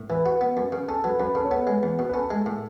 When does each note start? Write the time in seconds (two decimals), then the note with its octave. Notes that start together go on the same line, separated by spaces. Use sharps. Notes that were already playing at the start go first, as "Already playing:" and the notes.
Already playing: A2
0.10 E3 B4
0.25 F#4 B4
0.41 B3
0.57 F#2
0.72 C#3
0.88 C#4 A4
1.04 F#3 B4
1.20 F#2 B4
1.35 C#3 A4
1.45 C#5
1.51 B3 B4
1.67 G#3
1.83 E2
1.99 B2
2.09 B4
2.14 C#4 A4
2.31 G#3
2.46 A2